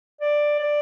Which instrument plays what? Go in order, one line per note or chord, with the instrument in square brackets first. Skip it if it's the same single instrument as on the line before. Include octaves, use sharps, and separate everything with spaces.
[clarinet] D5
D5